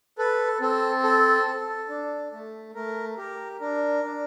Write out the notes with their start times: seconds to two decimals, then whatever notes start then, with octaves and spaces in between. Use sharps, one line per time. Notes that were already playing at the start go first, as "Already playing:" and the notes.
0.18 A4 B4
0.61 C4 A4
1.03 A4
1.47 A4
1.89 D4
2.32 A3
2.75 A3 A#4
3.18 G4 A#4
3.60 D4 A#4
4.04 D4